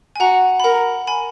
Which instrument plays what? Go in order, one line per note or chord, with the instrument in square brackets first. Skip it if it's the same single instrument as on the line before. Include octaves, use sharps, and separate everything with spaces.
[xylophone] G#5
[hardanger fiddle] F#4 [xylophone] F#5 A#5
[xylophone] B5
[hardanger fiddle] A#4 [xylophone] F#5 A#5
[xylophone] G#5 B5